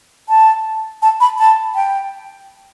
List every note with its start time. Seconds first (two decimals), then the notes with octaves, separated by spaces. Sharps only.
0.29 A5
1.02 A5
1.20 B5
1.38 A5
1.75 G5